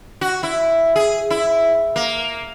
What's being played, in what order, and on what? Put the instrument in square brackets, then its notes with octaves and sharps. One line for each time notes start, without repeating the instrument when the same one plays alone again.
[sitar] F#4
E4
G#4
E4
A#3